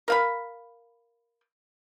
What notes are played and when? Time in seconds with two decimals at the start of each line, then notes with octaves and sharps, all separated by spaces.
0.08 A#4 F5 B5